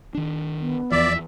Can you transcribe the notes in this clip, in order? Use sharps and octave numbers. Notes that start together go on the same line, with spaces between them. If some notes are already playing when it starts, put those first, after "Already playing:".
D#3 D4
B3
E2 E3 F3 D5 E5